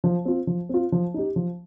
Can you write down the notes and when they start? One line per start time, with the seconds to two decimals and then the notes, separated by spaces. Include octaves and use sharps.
0.04 F3
0.25 C4 F4
0.47 F3
0.69 C4 F4
0.92 F3
1.14 D#4 G4
1.36 F3